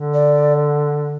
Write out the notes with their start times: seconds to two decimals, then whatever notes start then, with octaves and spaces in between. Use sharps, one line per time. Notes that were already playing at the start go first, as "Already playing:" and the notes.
Already playing: D3
0.14 D5